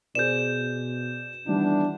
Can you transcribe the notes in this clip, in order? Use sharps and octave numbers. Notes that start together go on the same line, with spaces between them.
B2 G#4 C5 D5 G6 E7
D#3 E3 G3 B3 D4